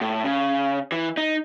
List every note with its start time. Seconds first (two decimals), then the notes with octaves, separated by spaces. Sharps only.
0.01 A2
0.24 C#3
0.92 E3
1.17 D#4